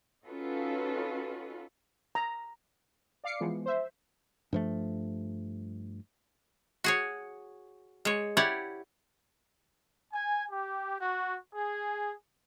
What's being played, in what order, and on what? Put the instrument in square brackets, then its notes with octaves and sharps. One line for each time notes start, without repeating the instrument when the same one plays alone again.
[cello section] C#4 D#4 F4 F#4 A4 B4
[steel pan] A#5
[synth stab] D5 F5 D6 C7 C#7
E3 F3 G#3 B3
C5 E5
[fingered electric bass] G2 F3 A3
[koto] F#4 G#4 C#5
G#3 C#5
E4 G4 C#5 D5 F#5
[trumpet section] G#5
G4
F#4
G#4